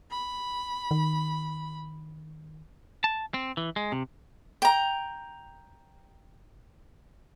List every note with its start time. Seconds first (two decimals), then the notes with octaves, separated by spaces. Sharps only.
0.11 B5
0.91 D#3
3.04 A5
3.34 C4
3.57 E3
3.76 G#3
3.92 C3
4.62 G5 A#5